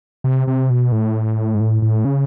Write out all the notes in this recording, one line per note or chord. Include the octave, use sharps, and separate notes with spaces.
C3
C3
B2
A2
G#2
A2
A2
C#3